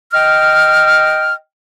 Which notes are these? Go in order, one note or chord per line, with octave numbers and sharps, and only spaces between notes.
D#5 G5 F6